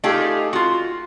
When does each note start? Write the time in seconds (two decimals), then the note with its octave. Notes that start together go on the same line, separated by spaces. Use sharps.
0.04 A3 D#4 F4 G4 G#4
0.53 F4 F#4